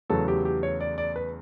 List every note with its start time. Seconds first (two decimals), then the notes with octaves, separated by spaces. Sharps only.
0.09 E2 C#3 F#3 A3 A4
0.28 G4
0.45 G4
0.63 C#5
0.80 D5
0.98 D5
1.16 B4